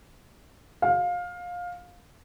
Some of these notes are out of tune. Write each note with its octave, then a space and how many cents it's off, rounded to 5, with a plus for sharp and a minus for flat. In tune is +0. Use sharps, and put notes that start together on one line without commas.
F5 +20